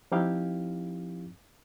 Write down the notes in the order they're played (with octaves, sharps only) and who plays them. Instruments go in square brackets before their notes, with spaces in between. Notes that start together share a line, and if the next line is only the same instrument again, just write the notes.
[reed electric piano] F3 C4 D#4 E4 G4 F5